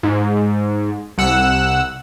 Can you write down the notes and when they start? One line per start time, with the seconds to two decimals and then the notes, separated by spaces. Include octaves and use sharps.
0.03 G#2
1.18 C2 F#5 E6